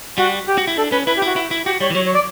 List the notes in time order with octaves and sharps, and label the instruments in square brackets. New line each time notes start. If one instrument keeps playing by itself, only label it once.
[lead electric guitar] G3 [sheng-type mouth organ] F#4
[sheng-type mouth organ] G4
[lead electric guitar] F#4
E4
[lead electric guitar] D4 [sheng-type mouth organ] A4
[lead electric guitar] C#4 [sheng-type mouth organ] B4
[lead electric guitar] E4 [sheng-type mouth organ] B4
[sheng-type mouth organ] G4
[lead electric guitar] E4 [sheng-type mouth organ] F#4
[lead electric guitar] E4
E4
[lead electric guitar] F#4 [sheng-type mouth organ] G4
[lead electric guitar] G3 [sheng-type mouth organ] C#5
[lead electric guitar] E3
[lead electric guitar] F#3 [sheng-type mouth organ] C#5
[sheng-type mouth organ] C#5
D5